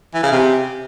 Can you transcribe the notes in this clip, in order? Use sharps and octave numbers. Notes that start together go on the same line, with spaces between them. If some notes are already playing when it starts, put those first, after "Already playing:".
E3
C#3
C3